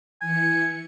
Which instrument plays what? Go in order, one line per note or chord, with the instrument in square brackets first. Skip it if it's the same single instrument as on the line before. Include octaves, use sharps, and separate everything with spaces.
[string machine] E3 C#7 [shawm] G#5